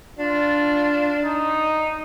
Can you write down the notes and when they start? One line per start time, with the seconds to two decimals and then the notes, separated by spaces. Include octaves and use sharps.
0.19 D4 F4
1.24 D#4